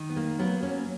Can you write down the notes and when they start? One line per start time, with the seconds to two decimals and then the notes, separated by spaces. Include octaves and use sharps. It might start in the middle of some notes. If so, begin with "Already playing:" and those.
Already playing: D#3
0.10 B3
0.17 A#3
0.39 F#3 A#3 B3
0.63 C#4